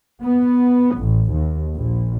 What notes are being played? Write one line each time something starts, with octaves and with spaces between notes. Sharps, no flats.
B3
A1
D#2
A#1